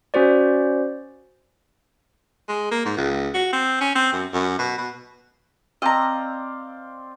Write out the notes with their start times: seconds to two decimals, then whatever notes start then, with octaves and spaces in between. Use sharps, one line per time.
0.14 C#4 F#4 C5 D5
2.49 G#3
2.71 A#3
2.86 G#2
2.97 C#2
3.34 F#4
3.53 C4
3.81 C#4
3.95 C4
4.13 F#2
4.33 F#2
4.59 B2
4.78 B2
5.82 C4 D5 D#5 F5 A#5